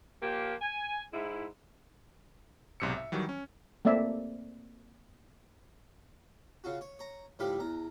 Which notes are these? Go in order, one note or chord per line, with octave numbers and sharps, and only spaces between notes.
A#2 F3 A#3 G4
G#5
G#2 E4
B1 G#2 C3 E6 C#7
E5
D#3 E3 F#3 G3
C#4
A3 A#3 C4 D5 E5
C#3 F4 F#4
C#5
C#5 A#5
A2 D3 F3 G3 G4 B5
E2 A#5